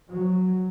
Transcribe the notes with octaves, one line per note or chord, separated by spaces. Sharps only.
F#3